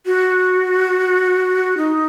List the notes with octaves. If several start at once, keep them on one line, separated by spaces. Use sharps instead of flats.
F#4
D#4